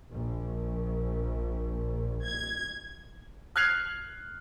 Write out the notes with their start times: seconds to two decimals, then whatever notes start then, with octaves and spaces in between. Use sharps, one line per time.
0.11 A#1
2.25 G#6
3.56 F6 F#6 G#6 C7 F7